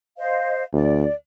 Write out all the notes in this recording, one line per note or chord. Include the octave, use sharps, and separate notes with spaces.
C5 D#5 F5
D2 D5